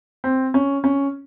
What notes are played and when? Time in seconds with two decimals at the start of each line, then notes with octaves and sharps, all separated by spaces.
0.24 C4
0.54 C#4
0.84 C#4